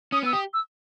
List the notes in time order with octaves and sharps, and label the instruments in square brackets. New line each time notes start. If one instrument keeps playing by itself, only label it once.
[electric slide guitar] C#4 [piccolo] D#6
[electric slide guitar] B3 [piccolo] E6
[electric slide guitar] G4 [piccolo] D#6
[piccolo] E6